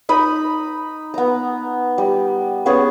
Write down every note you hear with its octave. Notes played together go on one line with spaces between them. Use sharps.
D#4 B5 D#6
B3 A#5
G3
B3 C#4 G#4